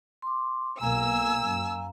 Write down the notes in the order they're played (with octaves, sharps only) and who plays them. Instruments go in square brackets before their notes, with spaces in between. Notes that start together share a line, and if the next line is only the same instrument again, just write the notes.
[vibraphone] C6 D6
[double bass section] B1 A#3 [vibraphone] F5 A#5 [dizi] G#5 [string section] E6
[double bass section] F#2